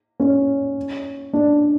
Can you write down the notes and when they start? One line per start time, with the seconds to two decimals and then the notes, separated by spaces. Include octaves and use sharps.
0.20 C#4
1.33 D4